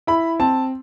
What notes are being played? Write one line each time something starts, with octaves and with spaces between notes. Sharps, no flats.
E4 B5
C4 A5